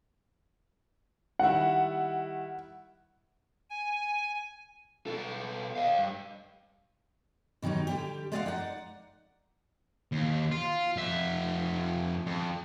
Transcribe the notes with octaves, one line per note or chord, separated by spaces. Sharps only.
D#3 G3 E4 F#5
G#5
B2 A4
D#5 F5
G2
B2 D#3 F#3 G3 D#4
D3 G3 G4
G#3 G#4 D5 D#5 F5 F#5
D#4 D5 F#5
D#2
F4
F2 E5
F2